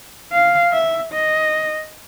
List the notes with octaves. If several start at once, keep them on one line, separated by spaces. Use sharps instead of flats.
F5
E5
D#5